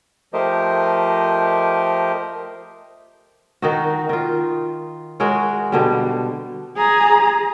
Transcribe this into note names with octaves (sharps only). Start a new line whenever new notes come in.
F3 A3 G4 A#4 C5 D#5
D#3 D#4 F#4
D#3 F4
G#3 F#4 A#4 C#5
B2 D3 G3
G#4 A#5